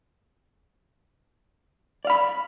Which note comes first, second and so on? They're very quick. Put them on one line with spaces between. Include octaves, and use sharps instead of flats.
D5 F5 B5